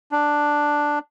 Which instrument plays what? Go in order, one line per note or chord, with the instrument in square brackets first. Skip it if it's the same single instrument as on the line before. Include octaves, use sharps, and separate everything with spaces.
[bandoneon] D4